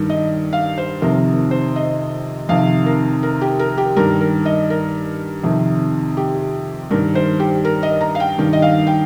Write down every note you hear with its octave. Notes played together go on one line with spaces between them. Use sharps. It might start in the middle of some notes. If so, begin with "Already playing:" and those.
Already playing: G2 D#3
D#5
F5
C5
F2 C3 D#3 A#4
C5
D#5
F2 C3 D#3 F5
A#4
A#4
G4
A#4
G4
G2 D#3 A#4
A#4
D#5
A#4
F2 C3 D#3
G4
G2 D#3 A#4
C5
G4
A#4
D#5
A#5
F5
G5
G2 D#3
D#5
F5
G5